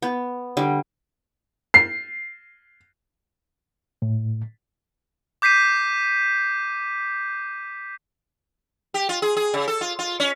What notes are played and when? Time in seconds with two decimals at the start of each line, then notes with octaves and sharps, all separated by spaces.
0.02 B3
0.57 D3 G3
1.74 C7
4.02 A2
5.42 D6 G6 B6 C7 D#7
8.94 G4
9.09 F4
9.22 G#4
9.37 G#4
9.54 C#3
9.68 A4
9.81 F4
9.99 F4
10.20 C#4